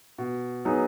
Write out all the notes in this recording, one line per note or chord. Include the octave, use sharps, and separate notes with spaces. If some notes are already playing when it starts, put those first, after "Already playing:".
B2
F#3 B3 D#4 G#4